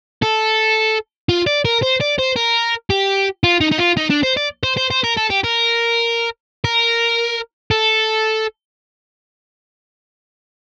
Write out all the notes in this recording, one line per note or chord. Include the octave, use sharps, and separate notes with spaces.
A4
F4
D5
A#4
C5
D5
C5
A#4
G4
F4
D#4
D#4
F4
D#4
D4
C5
D5
C5
C5
C5
A#4
A4
G4
A#4
A#4
A4